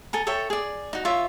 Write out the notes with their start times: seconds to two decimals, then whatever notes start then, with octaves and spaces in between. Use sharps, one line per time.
0.13 A4 G#5 A#5
0.27 A4 C#5 E5 G5
0.50 G#4 D5
0.93 D#4 F#4
1.05 F4 C#5 E5